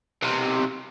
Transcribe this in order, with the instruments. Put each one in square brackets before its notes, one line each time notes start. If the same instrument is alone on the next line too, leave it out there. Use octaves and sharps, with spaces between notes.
[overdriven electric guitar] B1 C3